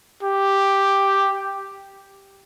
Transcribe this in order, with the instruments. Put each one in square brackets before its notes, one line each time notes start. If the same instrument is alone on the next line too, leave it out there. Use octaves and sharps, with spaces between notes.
[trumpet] G4